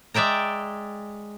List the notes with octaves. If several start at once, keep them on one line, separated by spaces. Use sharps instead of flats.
G#3 D5 E5 G5 A#5